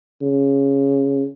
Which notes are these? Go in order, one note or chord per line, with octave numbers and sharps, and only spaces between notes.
C#3